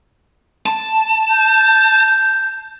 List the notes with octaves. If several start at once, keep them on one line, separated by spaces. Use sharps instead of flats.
A5
G6